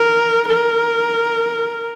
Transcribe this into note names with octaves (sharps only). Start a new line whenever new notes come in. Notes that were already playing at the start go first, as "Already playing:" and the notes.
Already playing: A#4
A#4